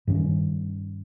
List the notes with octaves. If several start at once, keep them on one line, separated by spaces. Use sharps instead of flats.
G2 D#3 G3 C#4